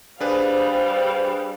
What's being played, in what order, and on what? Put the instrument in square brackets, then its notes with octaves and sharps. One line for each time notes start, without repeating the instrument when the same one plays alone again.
[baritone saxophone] G3 [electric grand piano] D4 G#4 B4 [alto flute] C5 [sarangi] F5